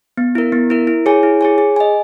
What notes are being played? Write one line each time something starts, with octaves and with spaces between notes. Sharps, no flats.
B3
E4 A#4
B3
E4 A#4
E4
G#4 C#5 G#5
E4
G#4 C#5 G#5
G#4
D#5 G#5